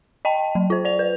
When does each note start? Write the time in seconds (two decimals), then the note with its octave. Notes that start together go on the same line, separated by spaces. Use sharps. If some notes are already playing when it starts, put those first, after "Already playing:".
0.25 D#5 G5 A5
0.55 F#3
0.70 F4 C5
0.85 D5 F7
0.99 B4